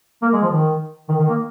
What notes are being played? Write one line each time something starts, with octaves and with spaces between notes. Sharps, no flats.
A#3
G#3
F3
D#3
D#3
D#3
A#3